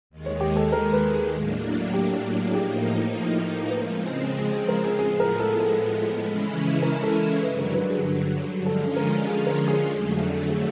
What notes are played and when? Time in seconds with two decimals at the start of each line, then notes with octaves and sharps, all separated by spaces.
0.10 D#2 D#3 G#3
0.26 C#5
0.41 G4
0.56 A4
0.72 A#4
0.93 B4
1.13 G#4
1.32 A2 F#3 A#3 D4
1.94 G4
2.51 G#4
2.55 A2 F3 A#3 D#4 G4
3.70 B4
3.77 C#3 F3 G#3 C4 A#4
4.39 G#4
4.53 G#4
4.69 A#4
4.84 G#4
4.99 A2 F3 G#3 B3 G#4
5.20 A#4
5.40 A4
5.60 A4
6.22 C#3 E3 G#3 C#4 E4
6.83 A#4
7.03 A4
7.43 G2 D3 F#3 B4
7.59 A#4
7.74 B4
7.90 G#4
8.05 G#4
8.66 D3 F3 G#3 C#4 F4 A4
8.96 A#4
9.27 G#4
9.47 A#4
9.68 G#4
9.88 F2 D3 F#3 A3
10.49 G#4